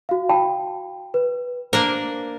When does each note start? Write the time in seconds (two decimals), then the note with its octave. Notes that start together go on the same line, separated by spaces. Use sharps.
0.09 F#4 F5
0.29 G5 A5 B5
1.14 B4
1.73 A#3 D4 A#4 C5